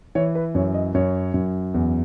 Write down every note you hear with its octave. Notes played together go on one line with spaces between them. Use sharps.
E3 C#5
B4
F#2 C#5
D#5
F#2 C#5
F#2
E2